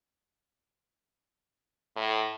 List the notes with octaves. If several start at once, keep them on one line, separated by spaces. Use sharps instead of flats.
A2